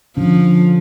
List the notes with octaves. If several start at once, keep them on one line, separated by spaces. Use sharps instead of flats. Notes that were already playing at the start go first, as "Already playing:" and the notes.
D3 F3 C#4